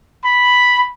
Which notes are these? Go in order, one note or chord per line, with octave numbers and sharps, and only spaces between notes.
B5